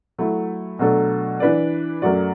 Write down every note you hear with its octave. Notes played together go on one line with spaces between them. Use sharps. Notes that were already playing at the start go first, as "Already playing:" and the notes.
F#3 A3 E4
B2 F#3 A3 D4 A4
E3 D4 B4 D5
F#2 F#3 A3 F#4 D5